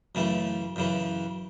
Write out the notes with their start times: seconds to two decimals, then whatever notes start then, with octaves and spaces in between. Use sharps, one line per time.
0.15 F#2 C#3 E3 A3
0.76 F#2 C#3 E3